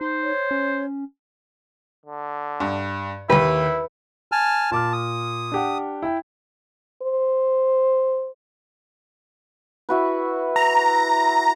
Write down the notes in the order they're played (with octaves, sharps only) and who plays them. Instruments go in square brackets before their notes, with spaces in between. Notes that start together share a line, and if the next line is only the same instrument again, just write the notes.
[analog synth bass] D#4 [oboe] C5
[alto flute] C#5
[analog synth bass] C#4
[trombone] D3
[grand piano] G2
[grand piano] D#2 G4 [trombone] E4 [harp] B4
[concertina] G#5 A5 F6
[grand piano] A#2 D6 F6 [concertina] A5
[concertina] D#6
[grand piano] D4 G4 F#5
E4 G5
[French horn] C5
[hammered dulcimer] E4 F#4 B4
[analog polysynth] A#5